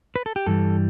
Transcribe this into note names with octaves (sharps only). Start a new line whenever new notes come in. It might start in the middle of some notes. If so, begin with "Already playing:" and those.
B4
A4
G4
G2 E3 G3 A4